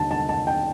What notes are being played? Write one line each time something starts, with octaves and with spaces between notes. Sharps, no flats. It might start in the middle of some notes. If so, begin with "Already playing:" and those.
Already playing: D#2 D3 A5
A5
A5
G5